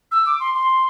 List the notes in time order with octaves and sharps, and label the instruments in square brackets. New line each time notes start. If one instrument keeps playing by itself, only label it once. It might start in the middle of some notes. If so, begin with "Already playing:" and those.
[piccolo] E6
D6
C6
C6